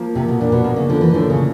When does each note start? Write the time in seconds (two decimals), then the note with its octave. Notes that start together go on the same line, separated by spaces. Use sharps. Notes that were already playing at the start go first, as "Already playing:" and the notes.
Already playing: F3 A#3
0.15 C3 A#3
0.28 B2
0.40 A#2 D4
0.52 B2
0.64 B2 A#3
0.76 C#3
0.90 D3 F3
1.01 E3
1.13 A2 D3
1.30 C#3